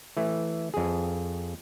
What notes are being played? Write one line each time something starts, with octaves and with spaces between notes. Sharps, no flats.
E3 A3
F2 G#4